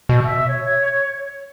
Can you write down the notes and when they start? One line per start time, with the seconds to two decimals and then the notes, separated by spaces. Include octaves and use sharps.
0.09 B2
0.24 E5
0.48 C#5